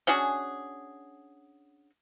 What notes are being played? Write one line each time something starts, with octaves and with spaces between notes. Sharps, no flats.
C#4 D4 F#4 G#4